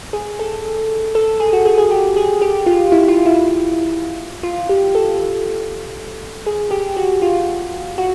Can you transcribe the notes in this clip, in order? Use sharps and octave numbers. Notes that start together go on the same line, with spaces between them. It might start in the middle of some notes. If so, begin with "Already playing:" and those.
G#4
A4
A4
G#4
F#4
G#4
G#4
G4
G#4
G4
F4
E4
F4
E4
F4
G4
A4
G#4
G4
F#4
F4
F#4